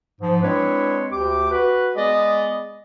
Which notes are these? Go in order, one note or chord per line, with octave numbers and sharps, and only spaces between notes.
G#2 F3
G#3 C4 D4 E4 B4 C#5
D2 G4 D6
F#4 B4
G#3 B3 G#4 D5 D#5